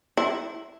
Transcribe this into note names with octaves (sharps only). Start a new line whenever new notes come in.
E4